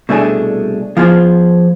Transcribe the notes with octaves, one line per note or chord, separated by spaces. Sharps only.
C2 B2 A3 D4 G#4
F3 B3 F4 G#4 C5